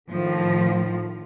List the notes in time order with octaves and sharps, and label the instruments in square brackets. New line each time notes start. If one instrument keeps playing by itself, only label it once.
[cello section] A2 D#3 F3